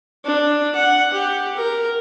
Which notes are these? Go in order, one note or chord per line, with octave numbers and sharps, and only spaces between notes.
D4
F#5
G4
A#4